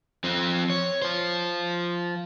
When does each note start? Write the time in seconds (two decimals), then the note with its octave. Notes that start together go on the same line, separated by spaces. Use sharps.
0.24 F3 C4
0.70 C#5
1.02 F4 C5